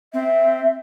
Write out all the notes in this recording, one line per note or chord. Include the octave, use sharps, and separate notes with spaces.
C4 E5